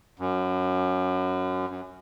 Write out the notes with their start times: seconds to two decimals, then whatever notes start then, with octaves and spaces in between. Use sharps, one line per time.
0.19 F#2
1.70 F#2